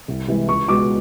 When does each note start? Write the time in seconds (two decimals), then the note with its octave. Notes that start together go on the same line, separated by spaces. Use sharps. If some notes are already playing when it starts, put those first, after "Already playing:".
0.08 C2
0.28 C3 E3 G#3
0.48 C#2 C#6
0.69 B2 G#3 D6